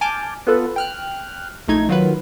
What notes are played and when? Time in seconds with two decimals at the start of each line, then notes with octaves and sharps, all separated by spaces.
0.01 G#5 A5 D6 F6 G6
0.47 B3 F4 A4 B4
0.76 G5 F6 F#6
1.68 A#1 A3 D#4 G#6
1.89 D#3 F#3 F4 F#4 B4